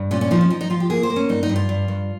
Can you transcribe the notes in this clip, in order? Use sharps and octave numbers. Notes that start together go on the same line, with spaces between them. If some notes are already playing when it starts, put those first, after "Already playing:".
Already playing: G2
A#2 C#4
C#4
F3 D#4
C#4
F3 D#4
D#4
F3 F4
G4
A#3 G#4
C5
A#3
C#4
G2 D#4
D#4
G2
F4
G2
G2